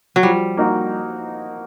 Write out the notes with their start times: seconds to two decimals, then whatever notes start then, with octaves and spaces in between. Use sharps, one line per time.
0.16 F#3
0.23 F3 G3
0.57 A#3 D#4 F#4